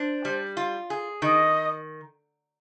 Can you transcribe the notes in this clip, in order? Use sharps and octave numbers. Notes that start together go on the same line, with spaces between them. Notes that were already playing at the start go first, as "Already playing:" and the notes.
Already playing: D4 C5
G3
F4
G#4
D#3 D#5